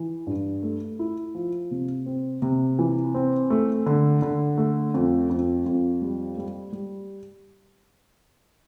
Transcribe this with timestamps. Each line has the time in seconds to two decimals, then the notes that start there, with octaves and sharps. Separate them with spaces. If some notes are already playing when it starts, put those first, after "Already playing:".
Already playing: E3
0.27 G2
0.63 A3
0.99 E4
1.35 F3
1.71 C3
2.06 C4
2.42 C3
2.79 E3
3.14 C4
3.50 A3
3.86 D3
4.22 D3
4.58 A3
4.94 F2
5.30 F2
5.66 F2
6.02 G3
6.38 G3
6.73 G3